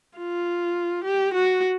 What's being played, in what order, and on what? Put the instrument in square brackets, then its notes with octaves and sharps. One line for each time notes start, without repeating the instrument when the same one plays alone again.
[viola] F4
G4
F#4